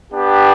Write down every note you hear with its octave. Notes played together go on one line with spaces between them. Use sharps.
B3 D4 G4